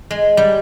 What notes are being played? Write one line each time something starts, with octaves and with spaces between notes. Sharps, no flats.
G#3
G3